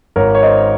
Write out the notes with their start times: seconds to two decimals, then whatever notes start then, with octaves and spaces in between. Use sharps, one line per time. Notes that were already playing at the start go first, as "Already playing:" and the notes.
0.16 G#1 A#4 C#5
0.35 C#5
0.43 C5 D#5